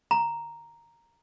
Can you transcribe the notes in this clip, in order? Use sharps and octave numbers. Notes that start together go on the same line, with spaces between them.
A#5